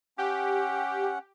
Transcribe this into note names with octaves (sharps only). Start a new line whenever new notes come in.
C#4 G4 F#5